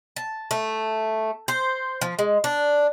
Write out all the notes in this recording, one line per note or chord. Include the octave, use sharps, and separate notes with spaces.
A5
A3
C5
F3
G#3
D4